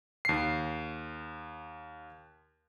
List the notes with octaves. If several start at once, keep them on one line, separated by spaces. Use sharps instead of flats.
D#2 C7